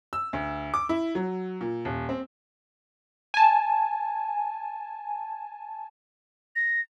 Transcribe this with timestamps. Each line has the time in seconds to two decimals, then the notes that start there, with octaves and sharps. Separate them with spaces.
0.13 E6
0.33 D2
0.74 D6
0.89 E4
1.15 F#3
1.61 A#2
1.85 D#1
2.09 C4
3.34 G#5 A5
6.56 A#6